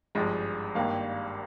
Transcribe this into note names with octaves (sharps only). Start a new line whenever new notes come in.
G#1 G2 F3 G#3
G#1 G2 D#3 G3 A#3 F5